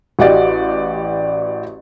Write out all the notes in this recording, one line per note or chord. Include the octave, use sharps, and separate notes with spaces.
A1 F#4 G4 D5 D#5